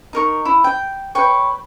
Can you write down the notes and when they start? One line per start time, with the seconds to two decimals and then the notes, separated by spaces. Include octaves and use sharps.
0.13 D#4 A#4 C#6
0.45 E4
0.64 G5
1.15 B4 C#5 G5 C#6